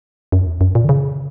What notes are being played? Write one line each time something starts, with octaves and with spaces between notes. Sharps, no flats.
F#2
E2
F#2
A#2
D3
C#3